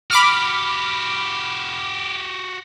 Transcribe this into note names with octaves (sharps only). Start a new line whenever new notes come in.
F#4 G4 B5 D6 F6